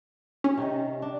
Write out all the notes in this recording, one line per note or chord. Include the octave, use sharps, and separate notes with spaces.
C#4
C3 D#3
D4